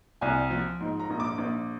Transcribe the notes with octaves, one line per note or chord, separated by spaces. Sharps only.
C2 G#5
F3
G#2
A#5
A#1
D6
A#1